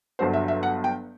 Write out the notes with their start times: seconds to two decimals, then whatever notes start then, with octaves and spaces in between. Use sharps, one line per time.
0.19 G1 G2 F#3 C5
0.33 E5
0.48 E5
0.63 F#5
0.84 G5